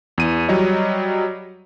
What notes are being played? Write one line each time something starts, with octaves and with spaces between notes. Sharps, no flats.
E2 D#7
F#3 G3 C#5 D#5